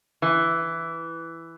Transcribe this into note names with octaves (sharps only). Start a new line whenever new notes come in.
E3